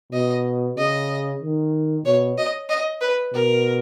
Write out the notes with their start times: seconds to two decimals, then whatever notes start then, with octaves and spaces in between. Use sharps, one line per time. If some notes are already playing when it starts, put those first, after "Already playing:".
0.12 B2 D#5
0.77 C#3 D#5
1.41 D#3
2.05 B2 C#5
2.38 D#5
2.69 D#5
3.01 B4
3.34 B2 A#4